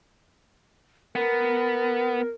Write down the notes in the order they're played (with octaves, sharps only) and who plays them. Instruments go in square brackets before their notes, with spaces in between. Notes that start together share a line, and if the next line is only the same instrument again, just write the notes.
[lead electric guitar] B3 [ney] A#4